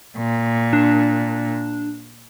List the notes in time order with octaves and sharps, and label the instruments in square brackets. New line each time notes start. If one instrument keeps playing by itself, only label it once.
[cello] A#2
[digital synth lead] D4